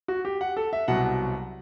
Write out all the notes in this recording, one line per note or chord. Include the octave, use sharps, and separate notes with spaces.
F#4
G4
F#5
A4
E5
C2 B2 F#3 F#5